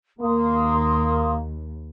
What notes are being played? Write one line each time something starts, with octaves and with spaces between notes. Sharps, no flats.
D#2 A#3 C6 D#6